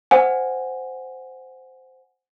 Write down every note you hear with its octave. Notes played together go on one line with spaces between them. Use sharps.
C5 F#5 G#5